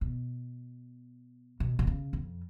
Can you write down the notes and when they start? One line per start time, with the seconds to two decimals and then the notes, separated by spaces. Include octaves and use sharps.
0.01 B2
1.60 B2
1.79 B2
1.87 C#3
2.13 F2